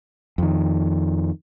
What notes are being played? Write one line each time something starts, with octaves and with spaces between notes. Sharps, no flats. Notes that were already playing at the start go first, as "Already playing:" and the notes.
F2 D#3